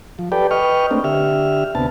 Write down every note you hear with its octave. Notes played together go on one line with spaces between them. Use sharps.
F3
G4 A4 B4 D5 G5
B4 D#5 G5 C#6 F6
A3 A#3 C4 D4
D3 G4 E5 F6
D2 C3 B3 A5